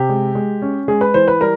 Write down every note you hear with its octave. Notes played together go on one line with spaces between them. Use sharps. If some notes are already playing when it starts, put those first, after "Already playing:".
Already playing: C3 G4
G#3
G#3
C#4
G#3 G#4
B4
E3 C5
B4
G3 A#4